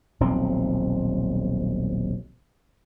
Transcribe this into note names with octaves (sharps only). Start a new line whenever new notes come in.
D#1 B1 F3 C4